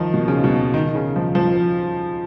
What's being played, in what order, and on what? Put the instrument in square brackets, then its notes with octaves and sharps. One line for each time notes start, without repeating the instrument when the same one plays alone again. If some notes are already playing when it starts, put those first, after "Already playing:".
Already playing: [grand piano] D#3 F3
B2
C#3
B2
D#3
C#3
F3
F3